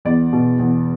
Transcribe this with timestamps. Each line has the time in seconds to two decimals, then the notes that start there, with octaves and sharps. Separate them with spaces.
0.05 E2 D5
0.33 B2
0.59 E2